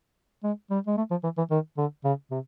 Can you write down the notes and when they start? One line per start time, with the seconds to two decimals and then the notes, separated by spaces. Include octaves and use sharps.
0.44 G#3
0.71 G3
0.87 G#3
0.97 A3
1.11 F3
1.24 E3
1.38 E3
1.51 D#3
1.77 D3
2.04 C#3
2.31 C3